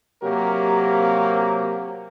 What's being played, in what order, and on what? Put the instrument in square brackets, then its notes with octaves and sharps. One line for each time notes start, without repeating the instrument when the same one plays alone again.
[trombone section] C3 F#3 A#3 G4 A#4